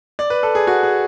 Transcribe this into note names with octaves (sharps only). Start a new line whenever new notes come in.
D5
B4
A4
G#4
F#4
G#4